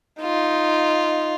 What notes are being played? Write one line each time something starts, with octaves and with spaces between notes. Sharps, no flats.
D#4 F4